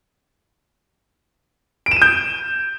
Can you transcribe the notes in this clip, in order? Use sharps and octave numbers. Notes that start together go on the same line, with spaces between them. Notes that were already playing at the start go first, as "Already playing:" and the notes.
D7
E7
D#7
G6